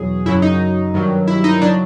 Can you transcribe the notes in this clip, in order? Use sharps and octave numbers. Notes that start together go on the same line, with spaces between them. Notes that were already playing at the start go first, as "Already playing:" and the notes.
Already playing: E2 B2 F#3 G#4
F#2 C#3 F#3 E4
D#4
G2 D#3 F#3
E4
D#4
C#3 F#3 D4